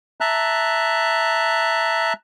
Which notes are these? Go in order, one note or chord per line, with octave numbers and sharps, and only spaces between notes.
E5 A5 A#5 F#6